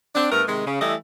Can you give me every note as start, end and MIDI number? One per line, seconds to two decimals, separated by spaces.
0.15 0.30 60
0.15 0.30 62
0.31 0.43 43
0.31 0.43 57
0.31 0.43 59
0.31 0.43 70
0.48 0.64 48
0.48 0.64 51
0.48 0.64 56
0.67 0.80 49
0.81 0.95 52
0.81 0.95 55
0.81 0.95 57
0.81 0.95 64
0.81 0.95 75